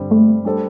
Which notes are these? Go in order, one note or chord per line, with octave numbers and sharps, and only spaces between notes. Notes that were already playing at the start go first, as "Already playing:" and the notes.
Already playing: G2 D3 G3 C4
A3
G3 D4 A4 C5